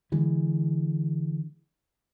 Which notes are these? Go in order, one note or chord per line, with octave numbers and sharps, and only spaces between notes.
D3 E3 G#3